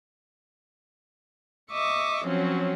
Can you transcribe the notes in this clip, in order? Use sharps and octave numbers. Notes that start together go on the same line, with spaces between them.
D#5 E5 C#6 D6
F3 F#3 C4 C#4